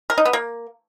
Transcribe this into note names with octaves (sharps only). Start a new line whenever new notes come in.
A#4
D#4
B3
A#3